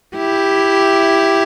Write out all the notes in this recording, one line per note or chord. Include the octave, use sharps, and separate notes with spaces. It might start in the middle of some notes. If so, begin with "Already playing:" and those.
E4 G4